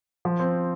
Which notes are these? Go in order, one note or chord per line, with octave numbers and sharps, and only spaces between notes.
F3
C4